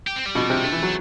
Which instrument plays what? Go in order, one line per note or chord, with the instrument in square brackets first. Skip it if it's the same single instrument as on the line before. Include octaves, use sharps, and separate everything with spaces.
[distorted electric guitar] G4
C4
G3
[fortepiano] B2
C3
[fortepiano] D3 [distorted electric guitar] A3
[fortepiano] E3
F#3